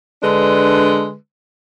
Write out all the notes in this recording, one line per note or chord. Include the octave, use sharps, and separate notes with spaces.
D3 G#3 D4 B4